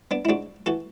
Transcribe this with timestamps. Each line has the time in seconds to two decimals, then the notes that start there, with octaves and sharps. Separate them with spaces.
0.11 B3 D4
0.25 E4
0.29 G#2 D4 F#4
0.66 E3 F#4 A4